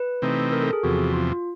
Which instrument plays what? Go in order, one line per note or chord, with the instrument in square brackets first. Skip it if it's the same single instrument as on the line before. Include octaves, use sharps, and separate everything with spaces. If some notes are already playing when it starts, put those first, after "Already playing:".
Already playing: [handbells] B4
[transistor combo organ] C3 E3 A3 C4 D#4
[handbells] A#4
A4
G#4
[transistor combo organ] E2 C3 F3 [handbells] F#4
[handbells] F4